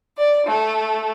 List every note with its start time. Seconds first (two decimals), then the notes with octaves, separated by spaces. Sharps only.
0.18 D5
0.47 A3